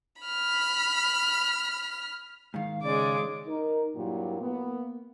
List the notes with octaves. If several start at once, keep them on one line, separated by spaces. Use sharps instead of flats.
B5 F6
G#2 D#3 F5
C#3 G#3 D5 D6
D#4 A#4
G2 A#2 F#3 A#3 E4 G4
A#3 B3